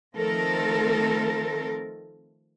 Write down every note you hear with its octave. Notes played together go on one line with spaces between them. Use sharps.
D#3 F3 A3 C4 A4 A#4